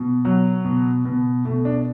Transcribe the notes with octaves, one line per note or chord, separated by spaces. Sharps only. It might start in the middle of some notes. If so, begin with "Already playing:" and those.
Already playing: B2
F#3
B2
B2
B2 A3
D4